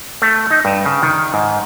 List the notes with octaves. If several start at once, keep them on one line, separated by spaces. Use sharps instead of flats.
A3
D#4
G2
C#3
D#3
G#2